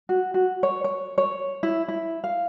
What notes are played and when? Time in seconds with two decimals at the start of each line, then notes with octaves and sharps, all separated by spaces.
0.09 F#4
0.34 F#4
0.63 C#5
0.84 C#5
1.18 C#5
1.63 E4
1.88 E4
2.24 F5